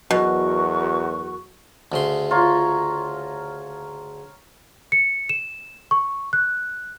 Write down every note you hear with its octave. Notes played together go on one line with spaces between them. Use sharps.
E2 B2 F#3 F#4 A#4 C#6
D2 C#3 C6
F4 C#5 A#5
C#7
E7
C#6
F#6